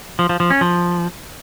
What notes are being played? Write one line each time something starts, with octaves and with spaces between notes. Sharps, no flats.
F3
F3
F3
C#4
F3